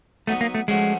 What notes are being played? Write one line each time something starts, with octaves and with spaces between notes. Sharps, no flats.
F#3 A3 B3 D#4
A#3
A3
F3 G#3 A3 C#4 F#4